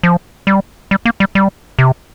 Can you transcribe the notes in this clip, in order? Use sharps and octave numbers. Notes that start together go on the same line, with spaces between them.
F3
G3
G3
A#3
G3
G3
C3